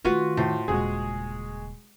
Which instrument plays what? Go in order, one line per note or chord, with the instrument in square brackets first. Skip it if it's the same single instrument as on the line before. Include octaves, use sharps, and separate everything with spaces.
[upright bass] D#3 A3 [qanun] F4 F#4 B4
[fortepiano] A2 [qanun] C5
[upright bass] D#1 C#3 [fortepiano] G#3 F#4 G#4